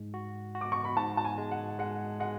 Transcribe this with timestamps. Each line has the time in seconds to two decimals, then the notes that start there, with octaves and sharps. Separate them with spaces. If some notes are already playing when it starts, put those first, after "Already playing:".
Already playing: G#2 G#3
0.14 F#4
0.55 F#4
0.61 D6
0.72 C#6
0.85 B5
0.96 G#2 A5
1.17 A5
1.25 G#5
1.38 G#3
1.51 F#5
1.79 G#3 F#5
2.20 G#3 F#5